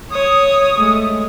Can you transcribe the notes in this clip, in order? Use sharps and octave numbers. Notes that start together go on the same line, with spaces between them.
C#5 D#6
G#3 A3